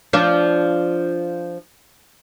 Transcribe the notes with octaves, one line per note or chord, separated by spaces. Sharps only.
F3 D4